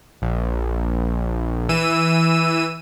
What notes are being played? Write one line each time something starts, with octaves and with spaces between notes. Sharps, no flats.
A#1
E3 E6 D#7